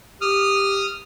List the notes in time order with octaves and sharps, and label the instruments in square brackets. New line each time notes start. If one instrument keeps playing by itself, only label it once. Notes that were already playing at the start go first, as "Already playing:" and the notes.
[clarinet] G4 [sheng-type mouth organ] D#6 F6